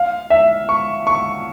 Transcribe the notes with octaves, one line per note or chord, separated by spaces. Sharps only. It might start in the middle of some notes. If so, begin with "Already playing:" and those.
Already playing: F5
E5
C#6
C#6